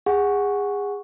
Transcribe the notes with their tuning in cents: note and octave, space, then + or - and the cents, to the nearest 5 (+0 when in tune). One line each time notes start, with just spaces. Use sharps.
G#4 -25 F#5 +0 C#6 +0